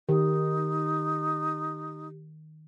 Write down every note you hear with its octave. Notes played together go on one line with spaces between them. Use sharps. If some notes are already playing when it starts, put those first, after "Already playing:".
D#3 D#4 G4